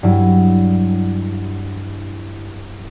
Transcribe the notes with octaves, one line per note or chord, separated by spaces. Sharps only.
G2 F#3 E4